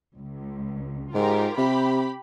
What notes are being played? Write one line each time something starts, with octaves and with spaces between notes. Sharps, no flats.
C#2
G#2 F4 G4 A#4
C3 G4 B5